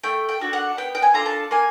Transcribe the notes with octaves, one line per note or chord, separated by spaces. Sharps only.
A3 G5
G5
D4 F#4 A4
F#5
B3 G5
G5
G#5
D4 F4 A4 A#5
A5
A#3 G#5